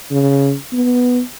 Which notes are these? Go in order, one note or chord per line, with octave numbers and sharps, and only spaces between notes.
C#3
B3